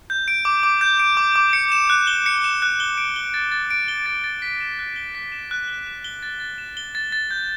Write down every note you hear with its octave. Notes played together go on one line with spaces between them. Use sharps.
G6
D7
D6
D6
G6
D7
D6
D6
C#7
E7
F#6
G7
C#7
E7
F#6
G7
D7
G7
A6
A6
D7
G7
A6
A6
B6
E7
F#6
G7
B6
E7
F#6
G7
E7
G7
A6
A6
E7
G7
A6
A6
G6